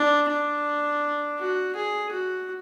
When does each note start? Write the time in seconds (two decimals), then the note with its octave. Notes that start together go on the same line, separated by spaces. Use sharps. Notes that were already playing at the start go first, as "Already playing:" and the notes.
Already playing: D4
0.30 D4
1.39 F#4
1.76 G#4
2.12 F#4